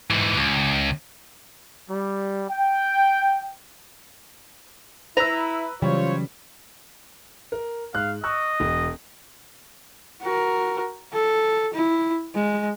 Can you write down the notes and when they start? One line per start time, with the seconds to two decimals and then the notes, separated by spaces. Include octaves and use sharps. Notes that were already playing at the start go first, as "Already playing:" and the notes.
0.11 G#2 E3
0.36 C#2
1.91 G3
2.51 G5
5.17 E4 B4 A#5 E6
5.82 C#3 E3 F#3 G3 F4 C5 C#5
7.52 A#4
7.94 G#2 F5 F#6
8.24 D#5 C#6 E6 F#6
8.60 E1
10.22 F#4 A#4
11.13 A4
11.74 E4
12.35 G#3